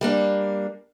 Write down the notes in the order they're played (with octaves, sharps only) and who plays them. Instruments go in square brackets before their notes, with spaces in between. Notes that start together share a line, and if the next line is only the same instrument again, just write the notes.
[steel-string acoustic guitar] G3 A#3 D4